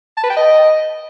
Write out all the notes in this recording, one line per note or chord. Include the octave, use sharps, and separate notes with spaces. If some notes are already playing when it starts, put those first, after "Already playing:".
A5
B4
G5
D#5